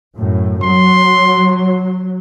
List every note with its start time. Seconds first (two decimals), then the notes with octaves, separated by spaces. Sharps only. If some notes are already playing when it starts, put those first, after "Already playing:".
0.16 F#2 A2
0.63 F#3 C6